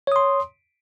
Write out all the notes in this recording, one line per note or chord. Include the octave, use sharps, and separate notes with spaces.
C#5 C6 D#6